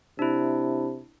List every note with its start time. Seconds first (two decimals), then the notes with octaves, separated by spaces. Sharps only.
0.19 C3 D4 E4